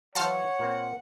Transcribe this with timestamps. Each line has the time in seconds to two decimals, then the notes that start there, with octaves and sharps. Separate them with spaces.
0.15 E3 F#3 C5 C#5 F5 F#5 A5
0.59 A#2 A#3 C4